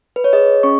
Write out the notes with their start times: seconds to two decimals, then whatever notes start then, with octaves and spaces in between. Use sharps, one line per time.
0.16 B4
0.24 C#5
0.33 G#4 D#5
0.63 C#4 C#6